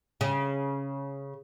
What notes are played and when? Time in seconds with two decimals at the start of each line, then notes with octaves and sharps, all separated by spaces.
0.21 C#3